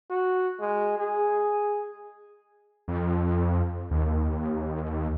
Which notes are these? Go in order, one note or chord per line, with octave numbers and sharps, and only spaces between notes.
F#4
G#3
G#4
F2
D#2